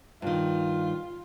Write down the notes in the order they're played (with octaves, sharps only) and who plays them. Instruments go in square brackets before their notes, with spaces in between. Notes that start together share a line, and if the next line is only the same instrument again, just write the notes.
[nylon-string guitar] G2 D#3 [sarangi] F4